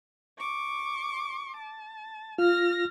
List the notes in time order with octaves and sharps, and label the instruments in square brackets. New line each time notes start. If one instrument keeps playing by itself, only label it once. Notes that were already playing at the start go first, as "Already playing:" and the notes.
[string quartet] C#6 D6
A5
[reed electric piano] F4 [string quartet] F6 A#6